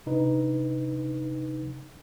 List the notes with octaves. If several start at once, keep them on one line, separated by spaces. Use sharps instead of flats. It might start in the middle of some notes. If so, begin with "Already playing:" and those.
C3 D4 D#4 B4